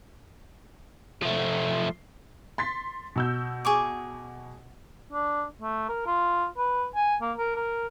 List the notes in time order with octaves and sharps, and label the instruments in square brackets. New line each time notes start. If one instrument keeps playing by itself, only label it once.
[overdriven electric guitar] F3 A3
[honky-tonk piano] C6 A6 B6
B2 E6 G6
[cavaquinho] G#4 C#6 D6
[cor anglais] D4
A3
A#4
F4
B4
G#5
A#3
A#4
A#4